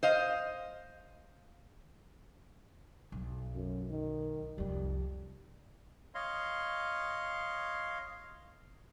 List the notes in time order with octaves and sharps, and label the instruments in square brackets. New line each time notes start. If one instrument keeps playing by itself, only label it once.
[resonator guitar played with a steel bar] C5 D#5 F5
[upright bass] B1
[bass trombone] F#2
D#3
[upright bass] C2 F2 [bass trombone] G3
[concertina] C#5 D#5 F5 C6